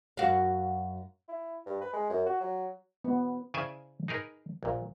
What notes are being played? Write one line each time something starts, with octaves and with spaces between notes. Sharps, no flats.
F#2 F#4 F5
E4
G2
B4
G#3
F#2
F#4
F#3
B3
C#3 E4 C5 D5 E5 G#5
D#4 G#4 A#4 B4
A#1 A#2